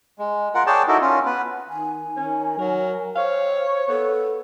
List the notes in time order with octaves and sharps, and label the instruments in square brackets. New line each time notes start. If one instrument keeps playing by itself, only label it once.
[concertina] G#3
F4 A#4 F#5
G#4 C#5 D5 G5 A5
D#4 E4 F#4 A4 A#4
C#4 F4
B3 B4
[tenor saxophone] D#3 [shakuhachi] G#5
[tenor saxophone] D#3 [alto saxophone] C#4
[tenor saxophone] F#3 [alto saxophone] A#4
[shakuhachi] C5 [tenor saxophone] C#5 [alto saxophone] F5
[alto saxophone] B3 [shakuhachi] A4